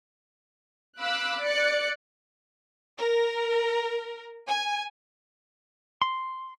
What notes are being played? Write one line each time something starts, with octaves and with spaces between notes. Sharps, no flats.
F5 B5 D6 E6 F#6
D5 F#6 C#7
A#4
G#5
C6